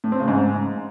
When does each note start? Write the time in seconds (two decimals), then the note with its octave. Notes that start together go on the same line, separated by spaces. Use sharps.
0.04 A2
0.12 C4
0.20 C#3
0.28 G#2